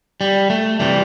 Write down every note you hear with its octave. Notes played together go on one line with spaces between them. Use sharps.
G3
A3
C3 E3 G3